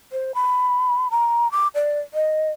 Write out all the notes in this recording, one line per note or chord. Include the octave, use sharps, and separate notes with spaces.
C5
B5
A#5
D6
D5
D#5